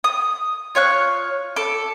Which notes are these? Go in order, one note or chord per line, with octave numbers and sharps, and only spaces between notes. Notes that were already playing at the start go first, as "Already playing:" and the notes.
D#6
F4 C#5 C#6 F#6
A4 D6